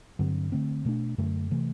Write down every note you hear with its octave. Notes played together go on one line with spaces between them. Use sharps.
G2 D3 F#3 C4
D3 A3 C4
B2 A3 D4
F#2 D3 A3
C3 E3 A3